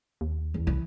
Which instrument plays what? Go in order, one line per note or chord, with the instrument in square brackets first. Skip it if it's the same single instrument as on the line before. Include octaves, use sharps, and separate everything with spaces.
[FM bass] D#2
[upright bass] E2
[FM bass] C2 [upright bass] E3